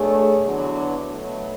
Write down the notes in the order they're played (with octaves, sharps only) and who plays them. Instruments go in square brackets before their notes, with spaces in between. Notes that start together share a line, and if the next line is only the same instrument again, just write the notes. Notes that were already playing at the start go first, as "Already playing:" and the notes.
Already playing: [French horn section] B2 A3 D4 G#4 C#5
E2 D3 F#3 B3 D4
B2 F#3 A3